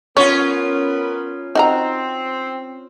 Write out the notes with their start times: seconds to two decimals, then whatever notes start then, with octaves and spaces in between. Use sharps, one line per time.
0.17 B3 C#4 F4 A#4 C#5
1.55 C4 D#4 F#4 A#5